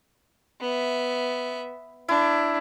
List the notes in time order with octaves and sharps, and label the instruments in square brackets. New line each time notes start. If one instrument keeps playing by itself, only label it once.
[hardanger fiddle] B3 E5
[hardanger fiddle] D4 [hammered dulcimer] E4